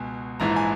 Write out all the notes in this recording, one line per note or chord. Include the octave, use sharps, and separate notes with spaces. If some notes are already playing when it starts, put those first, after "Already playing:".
Already playing: C#2 B2 G#5
A#1 G#2 E3 A#5
G#5